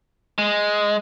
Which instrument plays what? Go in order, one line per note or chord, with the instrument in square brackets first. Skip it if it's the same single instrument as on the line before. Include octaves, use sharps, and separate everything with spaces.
[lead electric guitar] G#3